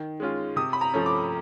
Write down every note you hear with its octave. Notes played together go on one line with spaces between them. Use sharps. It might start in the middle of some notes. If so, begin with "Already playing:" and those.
Already playing: D#3
G#3 C#4 F4
C3 D#6
B5
A#5
F3 A3 C#4
D6